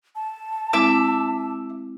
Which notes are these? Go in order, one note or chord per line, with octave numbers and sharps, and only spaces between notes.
A5
G#3 C4 E4 E5 D6